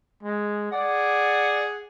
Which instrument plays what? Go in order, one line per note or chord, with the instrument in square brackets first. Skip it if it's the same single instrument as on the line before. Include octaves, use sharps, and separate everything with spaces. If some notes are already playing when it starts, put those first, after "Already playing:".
[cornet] G#3
[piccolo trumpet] G#4 [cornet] D5 [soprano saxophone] F#5